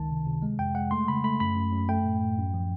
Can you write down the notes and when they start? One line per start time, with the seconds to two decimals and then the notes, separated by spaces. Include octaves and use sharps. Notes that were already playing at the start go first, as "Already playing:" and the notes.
Already playing: C#2 D#3 A5
0.11 C3
0.26 C3
0.42 G#3
0.59 F2 G5
0.75 G#3 F#5
0.91 A3 C6
1.08 C#3 B5
1.24 A3 B5
1.40 F#2 B5
1.56 F#2
1.72 F#2
1.89 A3 G5
2.05 A2
2.22 A2
2.38 F#2
2.54 F3